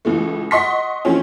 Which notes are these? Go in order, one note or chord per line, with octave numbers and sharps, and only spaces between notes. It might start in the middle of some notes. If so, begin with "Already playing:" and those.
C#2 E3 A3
D#5 F#5 C6 C#6 B6
E3 F3 A3 C4 C#4